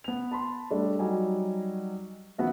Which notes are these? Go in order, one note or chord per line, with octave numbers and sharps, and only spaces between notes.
B3 F7
A5 B5 C6
G3 A3 D4
F#3 G3 D#4 G#5
D#3 F3 B3 F#4 E5